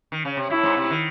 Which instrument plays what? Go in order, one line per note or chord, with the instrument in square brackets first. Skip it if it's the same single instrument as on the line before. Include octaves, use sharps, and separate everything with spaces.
[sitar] D#3
C#3
C3
[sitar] A2 [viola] E4
[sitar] G#2
C3
D#3